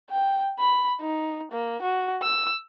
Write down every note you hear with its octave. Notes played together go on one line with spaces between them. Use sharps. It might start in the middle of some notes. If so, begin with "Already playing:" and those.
G5
B5
D#4
A#3
F#4
E6